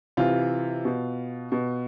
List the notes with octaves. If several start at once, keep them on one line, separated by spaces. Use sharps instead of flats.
C3 E3 F4
B2
B2